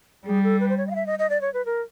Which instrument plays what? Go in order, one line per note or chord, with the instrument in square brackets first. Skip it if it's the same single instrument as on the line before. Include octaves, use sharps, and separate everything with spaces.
[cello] G3 [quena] G#4
[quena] A4
B4
C5
C#5
D#5
F5
E5
D#5
D#5
D5
C#5
B4
A#4